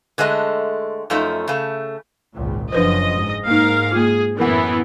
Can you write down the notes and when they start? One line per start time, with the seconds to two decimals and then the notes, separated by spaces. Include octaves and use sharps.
0.18 D3 G#3 A3 D#5
1.10 F#2 F3 A3 D#4
1.48 C#3 A3
2.33 G#1 C#2 A#2
2.72 F#1 F#2 F3 D4 B4 C5 D#5
3.17 G#2
3.47 G#2 A#3 D#4 A#4 F5
3.92 A#3 F4 G#4
4.39 F#2 A2 E3 B3 E4 A#4 F#5